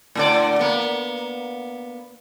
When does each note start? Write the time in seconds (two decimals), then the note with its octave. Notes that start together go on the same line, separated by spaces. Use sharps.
0.15 A2 D3 D5
0.59 A#3 B3